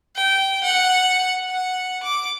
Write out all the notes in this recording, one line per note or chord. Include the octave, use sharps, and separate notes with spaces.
G5
F#5
F#5
D6